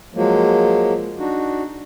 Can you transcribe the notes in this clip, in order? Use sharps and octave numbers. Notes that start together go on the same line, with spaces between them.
F3 F#3 G#3 A#3
D4 D#4 F#4